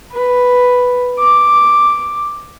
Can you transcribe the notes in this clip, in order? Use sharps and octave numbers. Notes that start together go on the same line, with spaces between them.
B4
D6